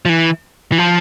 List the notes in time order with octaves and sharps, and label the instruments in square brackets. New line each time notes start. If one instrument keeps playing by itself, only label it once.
[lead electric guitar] F3
E3
E3
F3